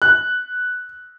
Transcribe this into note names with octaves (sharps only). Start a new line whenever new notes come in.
F#6